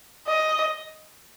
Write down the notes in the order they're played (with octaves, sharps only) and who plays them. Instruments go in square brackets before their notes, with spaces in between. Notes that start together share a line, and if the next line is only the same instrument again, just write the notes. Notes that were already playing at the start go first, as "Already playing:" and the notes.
[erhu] D#5